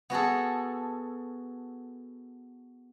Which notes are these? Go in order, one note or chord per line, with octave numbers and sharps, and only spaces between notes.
B3 F#4 G#4 A4